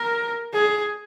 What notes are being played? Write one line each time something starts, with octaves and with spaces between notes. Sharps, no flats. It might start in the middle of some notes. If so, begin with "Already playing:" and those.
Already playing: A#4
G#4